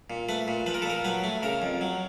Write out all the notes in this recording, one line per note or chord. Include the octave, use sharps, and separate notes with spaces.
A#2
A3 B4
A#2
F3 B4
A#4
A4
A#2 A#4
F#3 B4
A3
C#3 A#4
F2
F#3